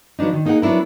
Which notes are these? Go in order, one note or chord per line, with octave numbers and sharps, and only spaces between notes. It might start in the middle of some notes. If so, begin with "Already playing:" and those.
F3 F#3 B3 D4 D#4
D#3
A#3 D#4 G#4 A#4 F#5
F#3 B3 D4 E4 A#4